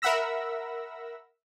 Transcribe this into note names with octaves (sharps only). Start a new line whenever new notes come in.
A#4 E5 F#5 B5 E6 A#6